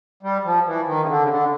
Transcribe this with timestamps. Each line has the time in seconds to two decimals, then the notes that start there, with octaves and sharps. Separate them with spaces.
0.23 G3
0.45 F3
0.66 E3
0.87 D#3
1.02 C#3
1.08 D3
1.23 C#3
1.30 D3